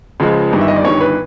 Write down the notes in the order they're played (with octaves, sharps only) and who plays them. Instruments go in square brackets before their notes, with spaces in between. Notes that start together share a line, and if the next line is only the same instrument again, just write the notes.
[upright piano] C#2 C#3 F3 G#3
G1 G2 D#3
E5
D#5
D5
G1 G2 D#3 C#5
B4